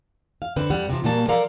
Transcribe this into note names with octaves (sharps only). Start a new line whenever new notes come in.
F5
D3 C4 B4
F2 G3 F#5
C3 F3
A#2 F#3 G3 A#3 A5
F3 A4 A#4 D5 F5 A#5